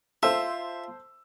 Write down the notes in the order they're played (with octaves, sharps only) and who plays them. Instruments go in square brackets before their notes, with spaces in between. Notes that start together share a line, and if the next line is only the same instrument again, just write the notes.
[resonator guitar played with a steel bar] F4 [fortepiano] A4 C5 [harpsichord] E5 [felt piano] E6